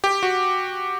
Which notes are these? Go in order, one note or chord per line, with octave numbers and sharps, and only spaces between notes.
G4
F#4